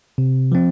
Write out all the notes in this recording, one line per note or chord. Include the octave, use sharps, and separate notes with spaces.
C3
F3 C4